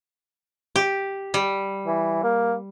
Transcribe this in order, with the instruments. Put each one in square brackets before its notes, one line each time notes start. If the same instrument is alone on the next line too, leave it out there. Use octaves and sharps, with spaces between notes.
[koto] G4
G3
[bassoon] E3
A#3